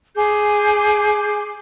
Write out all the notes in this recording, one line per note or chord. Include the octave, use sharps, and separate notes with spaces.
G#4 D6 G6